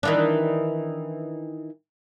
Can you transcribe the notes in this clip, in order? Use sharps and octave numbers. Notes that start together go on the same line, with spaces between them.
D#3 E3 D4